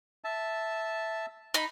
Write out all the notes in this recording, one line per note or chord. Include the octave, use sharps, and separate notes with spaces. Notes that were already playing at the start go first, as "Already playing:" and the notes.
E5 A5
D#4 B5